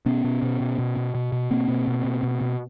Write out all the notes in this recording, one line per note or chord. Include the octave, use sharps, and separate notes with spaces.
B2 B3 C#4
B2
B2
B2
B2
B2
B2
B2
B2 A#3 C4
B2
B2
B2
B2
B2